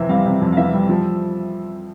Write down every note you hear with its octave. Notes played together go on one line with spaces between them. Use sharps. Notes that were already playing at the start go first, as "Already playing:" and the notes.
Already playing: F2 C3 E3 E5
G3 F5
C3
F2
F5
E3 E5
G3
F3